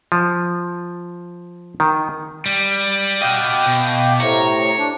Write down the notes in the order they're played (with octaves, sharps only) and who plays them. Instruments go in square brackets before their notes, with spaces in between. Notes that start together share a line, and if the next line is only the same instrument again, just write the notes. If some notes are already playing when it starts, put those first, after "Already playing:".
[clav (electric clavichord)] F3
D#3
[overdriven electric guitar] G3
[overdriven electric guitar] F#4 D#5 [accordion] F5 G5 D6
[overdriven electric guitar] B2
[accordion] A2 C3 A#5 [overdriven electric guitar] C#5
[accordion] D4